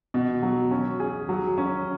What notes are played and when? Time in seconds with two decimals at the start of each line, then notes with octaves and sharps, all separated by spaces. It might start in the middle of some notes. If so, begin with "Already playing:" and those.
0.14 B2
0.43 F#3
0.71 C#4
1.00 G#4
1.29 F#3
1.58 C#4